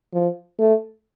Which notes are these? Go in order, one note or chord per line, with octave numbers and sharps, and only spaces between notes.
F3
A3